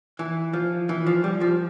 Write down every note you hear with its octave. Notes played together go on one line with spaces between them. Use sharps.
E3
F3
E3
F3
G3
F3